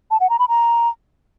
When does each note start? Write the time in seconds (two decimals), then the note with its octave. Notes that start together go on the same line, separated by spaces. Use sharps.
0.11 A5
0.20 F#5
0.30 A#5
0.39 B5
0.49 A#5